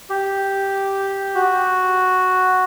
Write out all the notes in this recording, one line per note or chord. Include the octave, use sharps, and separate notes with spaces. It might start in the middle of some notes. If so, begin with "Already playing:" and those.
G4
F#4